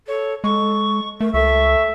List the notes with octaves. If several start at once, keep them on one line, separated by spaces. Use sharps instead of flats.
A4 C#5
G#3 A4 C#6
A3 A#4
C#2 A4 E5 C#6